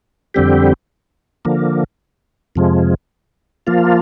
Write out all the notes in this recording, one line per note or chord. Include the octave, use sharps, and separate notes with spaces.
F2 D3 G3 C4 G4
D3 F3 A#3
F2 C3 F3 G#3
F3 A#3 F4